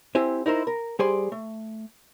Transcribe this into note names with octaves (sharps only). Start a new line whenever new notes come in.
C4 E4 G4 C5 G#5
D#4 E4 A#4 C5
A#4
G3 G#4 C5 D5 G#5 C6
A3